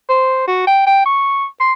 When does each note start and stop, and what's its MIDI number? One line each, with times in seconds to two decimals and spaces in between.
0.09 0.43 72
0.48 0.62 66
0.67 0.82 79
0.87 1.03 79
1.06 1.45 85
1.60 1.73 84